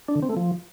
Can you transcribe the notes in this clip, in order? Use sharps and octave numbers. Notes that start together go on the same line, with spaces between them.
D4
D3
C4
A3
F3